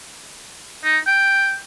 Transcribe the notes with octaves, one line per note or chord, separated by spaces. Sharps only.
D#4
G5